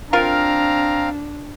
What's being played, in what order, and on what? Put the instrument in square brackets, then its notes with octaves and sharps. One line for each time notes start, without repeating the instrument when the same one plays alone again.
[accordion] C4 F5 [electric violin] D4 [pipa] F4 A#4 [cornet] A#5